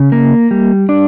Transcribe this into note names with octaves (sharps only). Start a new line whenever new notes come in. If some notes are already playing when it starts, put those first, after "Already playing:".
Already playing: C#3
A#3
G3
D4